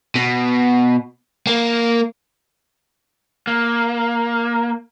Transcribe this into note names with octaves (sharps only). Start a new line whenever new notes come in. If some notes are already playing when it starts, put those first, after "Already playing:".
B2
A#3
A#3